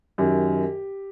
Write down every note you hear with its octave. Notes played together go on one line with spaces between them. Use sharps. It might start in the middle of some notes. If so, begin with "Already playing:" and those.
F#2 D#3 G4